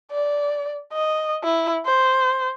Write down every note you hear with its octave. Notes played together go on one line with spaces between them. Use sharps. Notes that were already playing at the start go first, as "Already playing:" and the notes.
D5
D#5
E4
C5